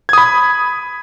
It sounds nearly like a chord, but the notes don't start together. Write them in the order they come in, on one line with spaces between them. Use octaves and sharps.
G#6 D#6 B5